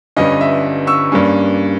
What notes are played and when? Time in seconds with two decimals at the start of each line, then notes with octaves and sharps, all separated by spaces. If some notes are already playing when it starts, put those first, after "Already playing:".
0.16 G1 G2 G3 C#4 D#5
0.41 E5
0.87 C#6 E6
1.12 G2 G3 A#3 C#4